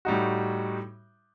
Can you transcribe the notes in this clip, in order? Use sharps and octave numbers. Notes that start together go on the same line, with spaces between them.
A2 G3 D#4 F#4